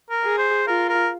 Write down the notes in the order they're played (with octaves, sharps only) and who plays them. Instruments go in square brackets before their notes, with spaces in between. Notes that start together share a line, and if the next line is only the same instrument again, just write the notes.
[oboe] A#4
[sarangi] G#4
[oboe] C5
[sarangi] F4 [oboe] A#4
[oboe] A#4